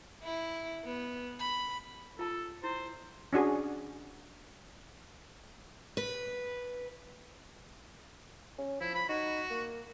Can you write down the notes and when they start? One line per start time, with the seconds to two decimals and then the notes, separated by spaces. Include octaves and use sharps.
0.24 E4
0.85 B3
1.40 B5
2.19 F4 A4 A5
2.64 E4 C5
3.33 C#4 D4 F#4 G#4
5.97 B4
8.58 C#4
8.81 F3 E4
8.94 B5
9.09 D#4 F#4
9.50 A#3